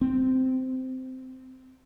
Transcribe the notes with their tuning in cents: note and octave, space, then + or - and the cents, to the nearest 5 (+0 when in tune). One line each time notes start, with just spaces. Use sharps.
C4 -15